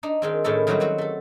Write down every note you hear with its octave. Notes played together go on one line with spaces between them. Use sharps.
D4 D#4
D#3 G#3 C4
A2 D#3 C#4 E4 A4
D#3 F#3 G3 C4 F#4 B4
F#3 C4 F#4
A3 A4